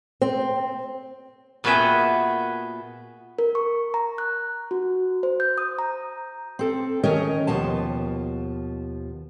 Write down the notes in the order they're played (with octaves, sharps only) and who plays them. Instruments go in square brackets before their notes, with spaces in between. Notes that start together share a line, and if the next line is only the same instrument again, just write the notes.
[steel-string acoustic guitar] C4
[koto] A#2 B3 F#4 G#4 E5 G5
[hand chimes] A#4
C#6
A#5
F#6
F#4
C5
G6
D#6
A#5
[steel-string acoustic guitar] C4 A4
D#3 A3 C#4 A#4 C#5 D#5
D#2 B2 F3 A5